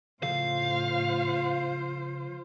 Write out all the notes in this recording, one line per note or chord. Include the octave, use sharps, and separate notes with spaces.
A2 C#3 F3 F4 A4 C5 F5